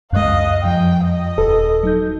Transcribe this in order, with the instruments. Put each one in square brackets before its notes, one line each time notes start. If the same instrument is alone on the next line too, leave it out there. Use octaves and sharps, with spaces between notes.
[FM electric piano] C#2 F#6 [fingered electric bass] F#2 G#3 [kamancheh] D#5 F5
[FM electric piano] F2 F3 [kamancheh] G5
[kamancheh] D#5
[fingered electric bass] D#1 [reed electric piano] A4 [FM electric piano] B4
[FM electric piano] F#3 D#4 G6